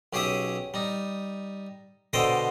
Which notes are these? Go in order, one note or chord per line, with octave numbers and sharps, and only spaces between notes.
B1 C#4 G4 G#4 E5 D#6
G3 D#4
B2 D3 A4 C5 D#5 G5